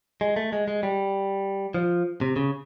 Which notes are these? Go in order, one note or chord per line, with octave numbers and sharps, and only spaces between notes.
G#3
A3
G#3
G#3
G3
F3
C3
C#3